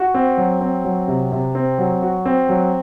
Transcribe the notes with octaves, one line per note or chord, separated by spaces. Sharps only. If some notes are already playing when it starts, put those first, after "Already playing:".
Already playing: F#4
C4
F#3
C4
F#3
C3
C3
C4
F#3
F#4
C4
F#3